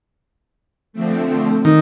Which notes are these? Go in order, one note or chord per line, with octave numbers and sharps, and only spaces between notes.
D3 F3 A3 C4
D#3